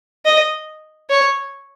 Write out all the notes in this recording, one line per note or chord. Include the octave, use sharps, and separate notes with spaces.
D#5
C#5